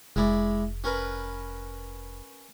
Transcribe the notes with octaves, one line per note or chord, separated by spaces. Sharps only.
F1 G#3 E4 D5
C#4 A#4 B4